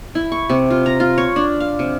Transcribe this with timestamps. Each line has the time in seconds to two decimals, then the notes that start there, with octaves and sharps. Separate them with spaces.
0.15 E4
0.32 C#6
0.49 C3
0.70 F4
0.86 A#5
1.00 F4
1.18 C#5
1.36 D4
1.60 F5
1.79 C3